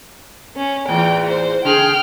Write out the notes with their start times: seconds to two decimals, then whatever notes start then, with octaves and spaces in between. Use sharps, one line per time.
0.56 C#4
0.88 E2 A2 G5
1.27 C5
1.65 C#3 G#4 G5 F6